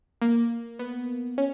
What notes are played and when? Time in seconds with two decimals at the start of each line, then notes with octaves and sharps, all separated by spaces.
0.22 A#3
0.79 B3
1.38 C#4